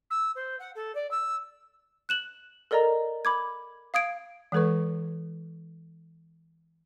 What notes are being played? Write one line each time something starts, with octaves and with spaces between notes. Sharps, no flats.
E6
C5
F#5
A4
D5
E6
F#6 E7 F#7
A4 A#4 D5 D#5 A#5
B5 D6 G#6
F5 D#6 G#6 D7
E3 G#3 A4 B4 C#6